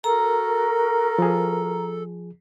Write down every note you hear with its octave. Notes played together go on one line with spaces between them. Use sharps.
F#4 A4 A#4 A#5
F3 G#4